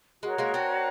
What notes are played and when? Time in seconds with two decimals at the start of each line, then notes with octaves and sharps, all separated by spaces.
0.23 G#3 F#4 A#4 C#5
0.38 G#3 A#3
0.54 C4 D4